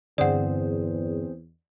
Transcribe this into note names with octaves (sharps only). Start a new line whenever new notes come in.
E2 G2 D3 C4 G#4 C5 D5 F#5